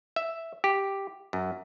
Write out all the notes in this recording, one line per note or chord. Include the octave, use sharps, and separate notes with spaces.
E5
G4
F#2